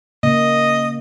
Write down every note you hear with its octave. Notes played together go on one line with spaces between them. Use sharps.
C#3 A#3 D#5